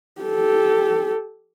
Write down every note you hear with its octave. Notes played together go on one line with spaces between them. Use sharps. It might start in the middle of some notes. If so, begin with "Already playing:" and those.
G4 A4